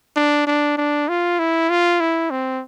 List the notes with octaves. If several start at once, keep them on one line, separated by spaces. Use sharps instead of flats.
D4
D4
D4
F4
E4
F4
E4
C4